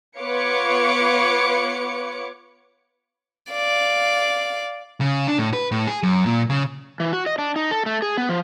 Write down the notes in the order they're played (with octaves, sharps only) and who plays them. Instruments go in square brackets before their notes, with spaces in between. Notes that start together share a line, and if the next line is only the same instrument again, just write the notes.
[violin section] B3 F4 B4 C#5 D6 C#7
[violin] D5 F5
[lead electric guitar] C#3
D4
A2
B4
A2
G#4
F#2
A#2
C#3
[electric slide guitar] E3
F#4
D#5
D4
D#4
A4
A3
G#4
B3
F3